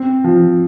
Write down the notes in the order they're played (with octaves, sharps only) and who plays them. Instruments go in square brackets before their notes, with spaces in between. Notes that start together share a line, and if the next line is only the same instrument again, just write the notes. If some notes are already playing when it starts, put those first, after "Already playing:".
Already playing: [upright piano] C4
F3